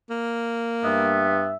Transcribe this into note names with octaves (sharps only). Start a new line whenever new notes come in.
A#3
G2 B3 E5